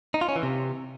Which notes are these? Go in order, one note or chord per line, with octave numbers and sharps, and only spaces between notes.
D#4
F4
C#4
E3
C3